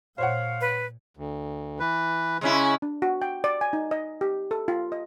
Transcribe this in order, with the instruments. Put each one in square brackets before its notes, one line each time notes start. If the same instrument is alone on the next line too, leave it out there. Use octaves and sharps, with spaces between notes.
[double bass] A#2 [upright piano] C5 C#5 F#5 [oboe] F5
[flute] B4
[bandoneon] D2
E3 B4
[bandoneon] C#3 [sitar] G#3 C#4 E4
[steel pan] D4
F#4
G5
D5
G#5
D#4
D#5
G4
A4
F4
D#5